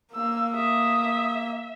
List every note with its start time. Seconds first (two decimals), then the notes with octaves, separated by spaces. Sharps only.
0.14 A#3 F5 E6
0.55 E5 D#6